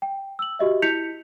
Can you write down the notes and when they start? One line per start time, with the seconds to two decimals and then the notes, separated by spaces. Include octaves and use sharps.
0.02 G5
0.39 E6 F#7
0.59 F#4 G4 D#5 E5
0.82 E4 G6 B6 C#7 F7